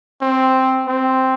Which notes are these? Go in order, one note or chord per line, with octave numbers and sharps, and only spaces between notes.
C4
C4